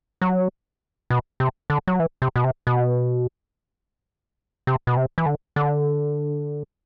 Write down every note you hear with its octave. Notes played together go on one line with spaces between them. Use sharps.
F#3
B2
C3
D3
F#3
E3
C3
B2
C3
B2
C3
B2
C3
E3
D3
D3